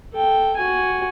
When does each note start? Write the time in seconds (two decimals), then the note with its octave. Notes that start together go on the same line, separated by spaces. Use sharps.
0.13 A4 G5
0.57 F#4 G#5